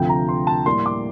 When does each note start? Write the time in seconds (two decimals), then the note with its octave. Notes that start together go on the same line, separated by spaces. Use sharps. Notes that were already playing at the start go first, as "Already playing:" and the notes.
Already playing: D2 C3 F3 G5
0.09 A#5
0.29 C6
0.47 A5
0.66 A2 G3 A#3 C6
0.86 D6